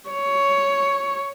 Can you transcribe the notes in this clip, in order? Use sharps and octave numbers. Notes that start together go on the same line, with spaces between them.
C#5